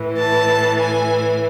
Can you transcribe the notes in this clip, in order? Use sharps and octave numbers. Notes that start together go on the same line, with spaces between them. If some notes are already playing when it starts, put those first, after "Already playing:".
Already playing: A2 E3
A5
G#5